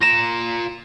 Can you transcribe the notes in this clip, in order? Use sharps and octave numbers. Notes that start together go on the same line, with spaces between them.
F4 A#5 A#6 E7